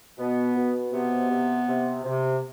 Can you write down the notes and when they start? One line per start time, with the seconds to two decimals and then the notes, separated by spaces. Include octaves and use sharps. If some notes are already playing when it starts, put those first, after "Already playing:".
0.18 B2 B3
0.55 B2
0.92 C3 B3
1.30 C3
1.68 C3
2.05 C3